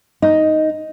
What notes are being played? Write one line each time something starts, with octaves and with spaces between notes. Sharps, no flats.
D#4